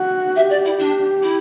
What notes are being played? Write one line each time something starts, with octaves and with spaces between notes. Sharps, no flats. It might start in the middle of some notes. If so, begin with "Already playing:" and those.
Already playing: F#4
G4 E5
D5
E4
D4
E4